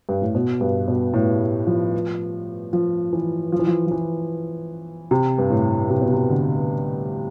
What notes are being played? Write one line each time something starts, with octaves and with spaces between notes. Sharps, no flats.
G2
A2
B2
G2
B2
A2
F3
F3
E3
F3
E3
F3
F3
E3
C3
G2
A2
C3
B2
C3
D3